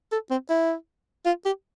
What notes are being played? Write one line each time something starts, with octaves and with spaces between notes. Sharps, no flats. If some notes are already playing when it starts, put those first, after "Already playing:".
A4
C4
E4
F4
G4